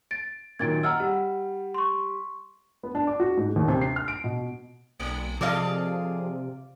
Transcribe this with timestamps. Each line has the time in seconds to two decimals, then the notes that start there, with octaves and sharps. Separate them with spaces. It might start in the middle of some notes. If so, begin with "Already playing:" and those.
0.11 A6 D7
0.59 F#2 A#2 D#3 G#6 A6 D7
0.83 D#5 F#5 A#5 E6 F6
1.00 G3 F#5
1.74 C6 C#6
2.83 B3
2.95 D4
3.07 D6
3.20 F#4
3.37 G#2
3.56 D#2
3.68 C3
3.81 C7
3.96 F6
4.08 D7
4.24 B2
5.00 B1 A3
5.41 C3 F3 G#4 A4 D5 D#5 F5